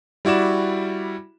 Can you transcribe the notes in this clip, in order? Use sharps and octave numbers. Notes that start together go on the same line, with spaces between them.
G3 E4 F#4 D5 E7